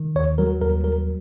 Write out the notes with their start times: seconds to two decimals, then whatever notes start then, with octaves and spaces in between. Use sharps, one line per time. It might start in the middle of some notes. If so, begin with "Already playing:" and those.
Already playing: D#3
0.15 D#2 C#5
0.38 F#3 A#4
0.61 D#2 A#4
0.84 F#3 A#4